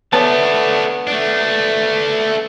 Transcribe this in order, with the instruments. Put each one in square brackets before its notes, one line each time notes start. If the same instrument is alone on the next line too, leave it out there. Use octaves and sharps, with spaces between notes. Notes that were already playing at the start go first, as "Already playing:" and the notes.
[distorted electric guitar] A3 D4 [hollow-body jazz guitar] B3 C#5 A5
[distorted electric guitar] A3 D4